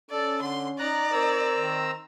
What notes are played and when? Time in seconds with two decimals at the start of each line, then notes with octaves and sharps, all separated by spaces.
0.10 C#4 A4 D5
0.42 D3 C6
0.79 D#4 D5 A#5 F#6
1.12 C4 A#4 A#5 E6
1.56 D#3